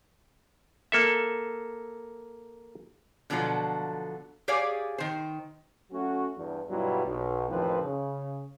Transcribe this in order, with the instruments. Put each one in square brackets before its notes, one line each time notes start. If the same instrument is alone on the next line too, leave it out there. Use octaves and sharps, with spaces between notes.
[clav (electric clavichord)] A#3 A4 E5
[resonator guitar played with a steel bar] B2 D3 F3 F#3 F4 A4
G4 G#4 C#5 D5 F5 G#5
D#3 C5
[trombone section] F#3 A3 C#4 F#4
E2 G2
G2 B2 F#3 G3 E4 F4
B1
A1 F2 D#3 F3 C4 B4
C#3